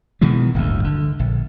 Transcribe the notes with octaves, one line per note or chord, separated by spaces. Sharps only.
B2 D#3 E3 G#3
D1 G1 D2
D3
A#1